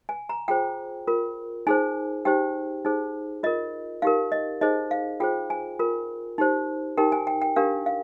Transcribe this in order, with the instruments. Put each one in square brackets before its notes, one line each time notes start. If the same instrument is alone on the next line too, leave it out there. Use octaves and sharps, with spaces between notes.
[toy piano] G#5
A#5
F4 G#4 C5 G5
F4 A#4
D#4 G#4 C5 G#5
D#4 G4 C5 G5
D#4 G#4 C5
F4 A#4 D#5
D#4 G4 A#4 F5
D#5
D#4 G#4 C5 D#5
F5
F4 G#4 C5 G5
G#5
F4 A#4
D#4 G4 C5
D#4 G4 A#4 G5
G#5
G5
G5
D4 G4 A#4 F5
F5